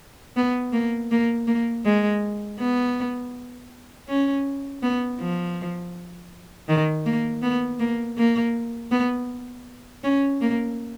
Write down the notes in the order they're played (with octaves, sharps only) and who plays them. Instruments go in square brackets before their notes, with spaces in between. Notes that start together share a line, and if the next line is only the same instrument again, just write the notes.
[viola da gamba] B3
A#3
A#3
A#3
G#3
B3
C#4
B3
F3
D#3
A#3
B3
A#3
A#3
B3
C#4
A#3